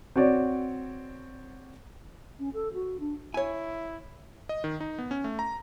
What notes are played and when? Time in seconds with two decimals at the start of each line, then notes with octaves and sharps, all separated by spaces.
0.16 C4 F#4 C#5 D5
2.39 C#4
2.54 A4
2.74 F#4
3.00 D4
3.34 E4 C#5 G#5
4.49 D#5
4.64 D#3
4.80 D#4
4.99 B3
5.11 C#4
5.24 A3
5.39 A#5